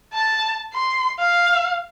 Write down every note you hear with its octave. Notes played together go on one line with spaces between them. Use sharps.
A5
C6
F5